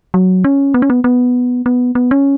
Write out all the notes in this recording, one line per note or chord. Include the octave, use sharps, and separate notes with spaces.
F#3
C#4
B3
C#4
B3
B3
B3
B3
C#4